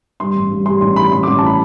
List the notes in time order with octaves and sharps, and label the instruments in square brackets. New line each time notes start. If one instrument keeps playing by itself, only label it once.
[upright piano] G2 C6
A1
G2
G3 C6
A1 C6
E3 B5
A1 C6
A1 D6
A5
E3 B5